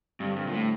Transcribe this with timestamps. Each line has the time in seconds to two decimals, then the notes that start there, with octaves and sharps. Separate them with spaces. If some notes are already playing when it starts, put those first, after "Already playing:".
0.20 G2 D3 G3 C4
0.36 G2
0.47 A#2
0.53 A2